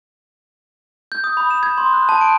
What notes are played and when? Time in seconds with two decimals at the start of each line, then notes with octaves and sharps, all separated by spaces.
1.12 G6
1.24 D#6
1.37 B5
1.51 E7
1.63 G#6
1.78 C6
1.93 F#6
2.09 A5
2.21 D7